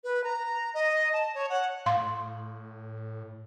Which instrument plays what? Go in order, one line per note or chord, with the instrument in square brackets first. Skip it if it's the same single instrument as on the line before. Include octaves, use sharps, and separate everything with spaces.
[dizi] B4
A#5
D#5
A5
C#5
F#5
[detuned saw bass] A2 [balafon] F5 C6